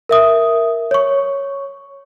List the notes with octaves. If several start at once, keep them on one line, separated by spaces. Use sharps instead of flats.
A#4 E5 D#6
C#5 C#6